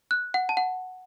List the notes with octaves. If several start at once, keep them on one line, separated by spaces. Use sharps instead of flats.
F#6
F#5
A5
F#5